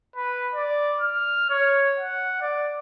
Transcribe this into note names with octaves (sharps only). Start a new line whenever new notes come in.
B4
D5
F6
C#5
F#5
D5